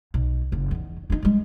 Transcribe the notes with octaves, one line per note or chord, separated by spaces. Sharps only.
B1
F#1
E2 D#3
D4 D#4
G3 G#3